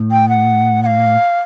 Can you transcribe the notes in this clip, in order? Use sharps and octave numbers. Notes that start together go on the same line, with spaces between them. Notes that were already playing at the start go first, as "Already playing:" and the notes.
Already playing: A2
G5
F#5
F#5
F5